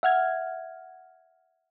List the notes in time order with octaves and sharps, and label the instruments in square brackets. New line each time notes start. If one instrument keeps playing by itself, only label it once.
[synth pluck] E5 F#5 F6 G#6